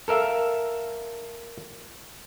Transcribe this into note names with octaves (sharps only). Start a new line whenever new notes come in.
A4 A#4 E5 F5